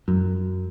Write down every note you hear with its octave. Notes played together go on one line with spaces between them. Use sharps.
F#2